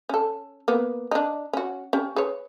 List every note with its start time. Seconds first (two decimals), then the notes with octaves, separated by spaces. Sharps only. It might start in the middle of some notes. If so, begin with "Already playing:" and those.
0.09 C#4 A4
0.68 A#3 B3
1.11 D4 D#4
1.53 C#4 F#4
1.93 C#4 G4
2.16 G#4 B4 C#5